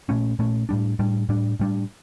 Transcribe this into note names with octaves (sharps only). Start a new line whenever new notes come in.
A#2 A3 C#4
A#2 A3 C#4
A2 G3 D4
A2 G3 D4
A2 G3 D4
A2 G3 D4